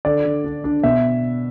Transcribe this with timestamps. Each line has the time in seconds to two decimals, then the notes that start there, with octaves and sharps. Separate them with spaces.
0.05 D3 D5
0.25 D3
0.44 D4
0.64 D4
0.83 B2 E5